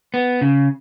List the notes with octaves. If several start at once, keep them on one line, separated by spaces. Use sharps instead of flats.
B3
C#3